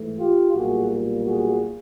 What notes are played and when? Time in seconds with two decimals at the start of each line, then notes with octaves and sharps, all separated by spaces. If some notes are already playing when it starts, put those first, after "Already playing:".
Already playing: G#2 E3 A3
0.18 F4 G4
0.54 B1 A#2 G3 A#3 F#4 G#4
1.26 F#4 G#4